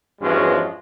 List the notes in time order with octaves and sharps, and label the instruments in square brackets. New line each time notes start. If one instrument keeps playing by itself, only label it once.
[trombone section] E2 G2 F3 G#3 C#4 F#4